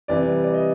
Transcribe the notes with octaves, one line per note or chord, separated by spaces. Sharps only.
C3 E3 G3 D5
D5
D#5